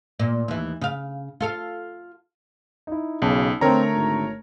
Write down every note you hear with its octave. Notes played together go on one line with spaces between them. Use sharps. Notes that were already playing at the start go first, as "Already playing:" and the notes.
A#2
D#2 E3
C#3 F5
F4 A4 F5
D#4 E4
B1 C#3 A5
D3 A3 C4 A#4 C#5 A#5
G#1